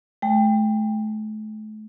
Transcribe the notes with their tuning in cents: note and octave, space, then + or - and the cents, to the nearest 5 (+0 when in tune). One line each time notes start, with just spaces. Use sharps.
A3 -40 G5 +15